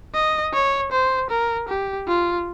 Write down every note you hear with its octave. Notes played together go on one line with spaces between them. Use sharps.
D#5
C#5
C5
A#4
G4
F4